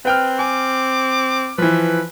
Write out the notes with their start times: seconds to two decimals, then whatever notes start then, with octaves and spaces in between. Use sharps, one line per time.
0.05 C4 B4 G5 F6
0.39 G#5 D6
1.58 E3 F3 B4